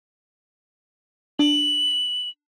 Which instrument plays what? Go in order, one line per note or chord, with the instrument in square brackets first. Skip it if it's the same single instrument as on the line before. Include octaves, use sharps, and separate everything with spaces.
[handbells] D4 [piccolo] F#7